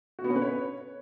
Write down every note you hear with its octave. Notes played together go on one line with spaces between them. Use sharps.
F#4
B3
C#4
B4
C#5